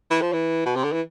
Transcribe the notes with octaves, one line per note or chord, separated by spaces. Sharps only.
E3
F3
E3
B2
C3
D3
E3